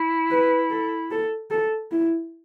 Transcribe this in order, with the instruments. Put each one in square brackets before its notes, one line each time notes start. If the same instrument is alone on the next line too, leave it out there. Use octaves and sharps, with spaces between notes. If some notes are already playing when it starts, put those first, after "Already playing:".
Already playing: [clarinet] E4
[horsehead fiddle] B4
A4
A4
A4
E4